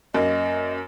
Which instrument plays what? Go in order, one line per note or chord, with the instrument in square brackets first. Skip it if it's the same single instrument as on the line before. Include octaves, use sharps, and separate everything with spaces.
[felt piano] F#2 A#3 [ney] D#5